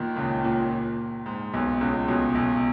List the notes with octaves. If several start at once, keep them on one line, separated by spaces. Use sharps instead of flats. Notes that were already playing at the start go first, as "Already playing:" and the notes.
Already playing: D#2 A#2 D#3
C#2 C#3
A#2
G#2
B1 B2
C#2 C#3
B1 B2
B1 B2